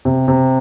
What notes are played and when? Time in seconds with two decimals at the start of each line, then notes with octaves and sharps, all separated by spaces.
0.05 C3
0.28 C3